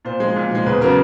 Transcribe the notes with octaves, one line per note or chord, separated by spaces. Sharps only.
A#2 C5
F3 G#3
A#2
F3 G#3
E2 B4
C#3 F#3 B3 A#4